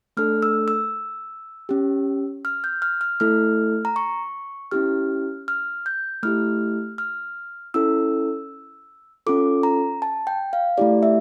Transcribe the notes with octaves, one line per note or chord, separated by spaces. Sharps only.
A3 D4 A4 F6
E6
E6
C#4 G4
F6
G6
F6
F6
A3 E4 A4 F6
A#5
C#6
C#4 E4 G4 F6
F6
G6
A3 E4 G4 F6
F6
C#4 E4 A4 E6
C#4 F4 A4 D6
A#5
A5
G5
F5
A3 E4 G4 D5
E5